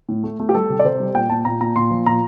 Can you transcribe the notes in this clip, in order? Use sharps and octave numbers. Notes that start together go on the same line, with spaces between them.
A2
A3
A3
G4
G3 A4
C3
D5
C3 C5
G3
A#2 G5
A#2 A5
A#2 A#5
A#2 A#5
A#2 C6
F3
A#2 A#5